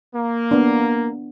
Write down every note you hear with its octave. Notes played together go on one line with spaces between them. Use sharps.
A#3
B3 D4